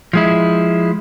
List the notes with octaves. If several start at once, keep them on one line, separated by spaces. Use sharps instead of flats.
F3 G#3 E4